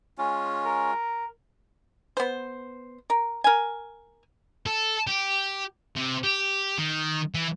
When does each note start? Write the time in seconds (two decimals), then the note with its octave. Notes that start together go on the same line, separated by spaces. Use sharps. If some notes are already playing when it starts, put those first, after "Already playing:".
0.18 G#3 C#4 F4
0.66 A#4
2.17 B3 C5
3.10 A#4
3.44 A#4 G#5
4.66 A4
5.07 G4
5.96 C3
6.24 G4
6.78 D#3
7.34 E3